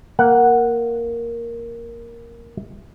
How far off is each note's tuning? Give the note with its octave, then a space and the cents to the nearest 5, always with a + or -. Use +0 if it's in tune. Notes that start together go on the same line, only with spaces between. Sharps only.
A#3 +0 F#5 +0